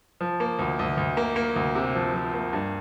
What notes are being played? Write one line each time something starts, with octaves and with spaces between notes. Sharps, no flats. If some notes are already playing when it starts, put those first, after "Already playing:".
F3
A#3
D2
D2
D2
A#3
A#3
D2
C3
F3
F3
A#3
G2